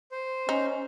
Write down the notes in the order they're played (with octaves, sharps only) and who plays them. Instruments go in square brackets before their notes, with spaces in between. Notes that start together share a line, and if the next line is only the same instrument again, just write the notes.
[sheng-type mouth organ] C5
[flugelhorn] C#4 [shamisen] D#4